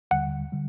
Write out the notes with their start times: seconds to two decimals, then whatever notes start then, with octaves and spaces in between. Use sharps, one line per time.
0.11 D#2 D3 G3 F#5
0.52 D3 G3